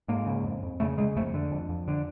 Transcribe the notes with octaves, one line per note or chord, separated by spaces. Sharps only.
G#2 A#3
C#3
F2
F2
C#3 A3
C#3 G#3
F2 A3
D3
F2
F2
D3